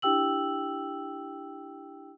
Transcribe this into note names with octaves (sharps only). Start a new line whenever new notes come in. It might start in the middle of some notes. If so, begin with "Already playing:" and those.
D4 E4 G4 G5 E6 F#7